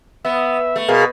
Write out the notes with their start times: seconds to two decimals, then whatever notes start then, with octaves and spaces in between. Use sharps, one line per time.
0.25 B3 E5
0.76 A3
0.88 B2 G#4 A#4 F5